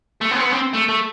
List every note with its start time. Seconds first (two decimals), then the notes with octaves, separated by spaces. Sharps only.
0.21 A3
0.31 B3
0.36 C4
0.41 B3
0.52 C4
0.74 A3
0.89 A3